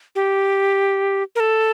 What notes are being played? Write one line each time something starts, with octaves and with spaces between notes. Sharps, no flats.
G4
A#4
A4